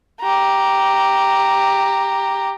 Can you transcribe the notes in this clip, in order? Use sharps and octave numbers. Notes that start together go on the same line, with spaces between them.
G4 A#5